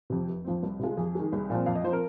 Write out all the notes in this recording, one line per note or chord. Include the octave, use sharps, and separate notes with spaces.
F2 C3
F1
F2 F3 C4
C2
C3 G#3 F4
F2 G#4
D#3 G#3
C2
A#2 F3 C4
F2 F5
D#5
F3 C4 A#4 C5